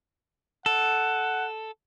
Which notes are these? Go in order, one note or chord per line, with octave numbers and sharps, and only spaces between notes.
A4 F#5